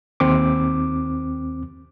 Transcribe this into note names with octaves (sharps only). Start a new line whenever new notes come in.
D#2 C4 D6